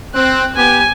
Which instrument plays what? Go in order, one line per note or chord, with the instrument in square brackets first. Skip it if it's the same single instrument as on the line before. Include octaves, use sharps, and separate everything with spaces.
[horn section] C4 [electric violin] F#6
[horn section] B3 G4 [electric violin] G#5